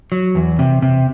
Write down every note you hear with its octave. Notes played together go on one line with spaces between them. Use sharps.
F#3
E2
C3
C3